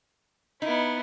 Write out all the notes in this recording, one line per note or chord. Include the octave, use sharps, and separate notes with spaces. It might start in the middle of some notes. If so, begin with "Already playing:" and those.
B3 D#4 E4